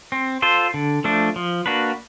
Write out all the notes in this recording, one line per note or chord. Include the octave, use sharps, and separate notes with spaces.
C4
F4 A4 C5
D3
F3 A3 D4
F3
A#3 D4 F#4 B4